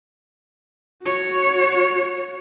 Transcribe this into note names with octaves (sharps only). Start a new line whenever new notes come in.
F#4 C#5